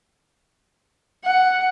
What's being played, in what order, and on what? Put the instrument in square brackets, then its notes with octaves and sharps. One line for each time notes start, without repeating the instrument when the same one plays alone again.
[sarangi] F#5